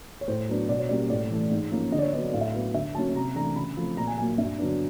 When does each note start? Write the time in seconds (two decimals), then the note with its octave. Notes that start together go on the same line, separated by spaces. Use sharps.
0.21 C#5
0.28 A2 C5
0.49 F#3 B3 D4
0.69 B2 D5
0.79 C#5
0.89 G3 A#3 C#4 D5
1.10 A2 D5
1.31 E3 A3
1.51 G#2
1.72 F3 A#3 C#4
1.92 D3 D#5
1.98 D5
2.02 C#5
2.12 F#3 B3 D4 D#5
2.33 A2 F5
2.41 E5
2.48 F5
2.54 F#3 B3
2.74 D3 E5
2.95 F#3 A#3 C#4 A5
3.15 C3 A#5
3.35 E3 A3 D4 A#5
3.56 C#3 B5
3.77 F3 A3 C4
3.97 A#2 A#5
4.07 G#5
4.18 F#3 A#3 G#5
4.38 G2 E5
4.58 D3 F#3 B3 D4